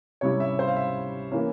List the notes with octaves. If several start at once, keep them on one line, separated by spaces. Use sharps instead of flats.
C3 G3 C#4 E4 C#5
E5
C5
F5
E5
E3 A#3 C#4